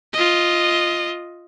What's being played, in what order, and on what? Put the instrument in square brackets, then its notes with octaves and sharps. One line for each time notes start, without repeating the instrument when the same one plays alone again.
[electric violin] F4 D#5